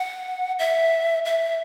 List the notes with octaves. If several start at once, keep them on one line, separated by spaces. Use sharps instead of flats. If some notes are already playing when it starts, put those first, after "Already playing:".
Already playing: F#5
E5
E5